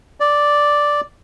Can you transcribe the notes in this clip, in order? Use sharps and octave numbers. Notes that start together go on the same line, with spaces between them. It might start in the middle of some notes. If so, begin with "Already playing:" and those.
D5